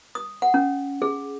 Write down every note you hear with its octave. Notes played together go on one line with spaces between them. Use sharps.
D#6
F#5
C#4
G#4